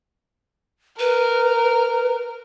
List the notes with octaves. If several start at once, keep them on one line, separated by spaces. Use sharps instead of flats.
A#4 B4